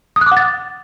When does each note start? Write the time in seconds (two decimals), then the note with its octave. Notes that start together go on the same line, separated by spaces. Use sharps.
0.16 D#6
0.21 F#6
0.26 D6
0.31 F#5
0.37 A6